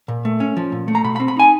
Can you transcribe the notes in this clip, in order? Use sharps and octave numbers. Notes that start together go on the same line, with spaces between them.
A#2
A3
C#4
F3
A#2
A3
A#5
B2 B5
B5
C4
B5
D#4 G#5